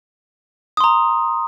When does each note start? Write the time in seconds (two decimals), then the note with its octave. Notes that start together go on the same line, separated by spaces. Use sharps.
0.77 D#6
0.80 C6
0.84 A#5